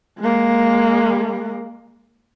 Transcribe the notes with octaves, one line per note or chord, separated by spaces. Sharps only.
G#3 A#3